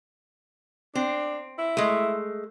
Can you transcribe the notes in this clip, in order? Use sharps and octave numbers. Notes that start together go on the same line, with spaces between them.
C4 D4
E4
G#3 A3